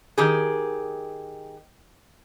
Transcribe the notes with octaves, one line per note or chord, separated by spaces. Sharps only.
D#3 G4 G#4